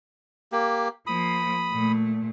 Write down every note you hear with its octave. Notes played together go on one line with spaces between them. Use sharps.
A#3 G4
F3 A#3 B5 D#6
A#2 A3